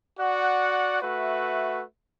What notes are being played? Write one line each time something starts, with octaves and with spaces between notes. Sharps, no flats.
F#4 D5 F#5
A3 F#4 B4 E5